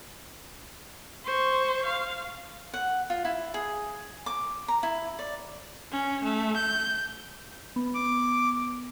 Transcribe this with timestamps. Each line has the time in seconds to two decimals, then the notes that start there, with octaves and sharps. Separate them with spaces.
1.25 C5 C#6
1.86 F5
2.74 F#5
3.10 F4
3.25 E4
3.54 G#4
4.26 D6
4.68 A#5
4.83 E4
5.19 D5
5.92 C#4
6.24 A3
6.56 G6
7.76 B3
7.95 D6